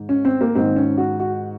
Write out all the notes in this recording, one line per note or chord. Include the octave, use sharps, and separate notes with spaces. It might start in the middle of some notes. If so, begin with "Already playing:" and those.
Already playing: G#2 D#3
C#4
C4
A#3
G#2 D#3 C4
C#4
F#4
F#4